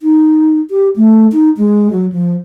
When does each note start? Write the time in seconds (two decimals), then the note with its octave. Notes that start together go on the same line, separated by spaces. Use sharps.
0.01 D#4
0.70 G4
0.96 A3
1.32 D#4
1.57 G#3
1.90 F#3
2.12 F3